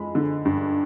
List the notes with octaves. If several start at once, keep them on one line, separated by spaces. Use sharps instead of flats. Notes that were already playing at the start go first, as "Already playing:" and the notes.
Already playing: F3 G#3 B5
D3
G2